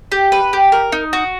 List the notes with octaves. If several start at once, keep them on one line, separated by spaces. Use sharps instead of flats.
G4
B4
G4
A#4
D#4
F#4